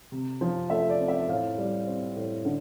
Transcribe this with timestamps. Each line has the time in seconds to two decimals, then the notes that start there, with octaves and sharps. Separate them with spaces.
0.12 C3
0.41 F3
0.70 A3 E5
0.89 D5
0.99 C4
1.08 E5
1.28 A2 F5
1.58 G3
1.87 C4
2.16 A2
2.45 D3